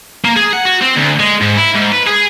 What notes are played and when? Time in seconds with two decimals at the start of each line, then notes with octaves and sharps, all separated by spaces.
0.25 A#3
0.36 G#4
0.53 F#5
0.65 F#4
0.82 C4
0.97 D2
1.20 G#3
1.42 G#2
1.57 E4
1.75 G#2
1.92 B4
2.07 G#4